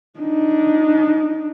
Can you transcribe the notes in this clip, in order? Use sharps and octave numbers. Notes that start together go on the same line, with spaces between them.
D4 D#4